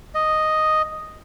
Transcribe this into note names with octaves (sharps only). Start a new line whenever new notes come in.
D#5